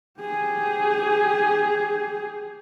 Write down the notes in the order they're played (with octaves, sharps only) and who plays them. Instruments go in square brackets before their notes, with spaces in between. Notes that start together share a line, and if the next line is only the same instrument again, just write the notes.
[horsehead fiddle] G4 G#4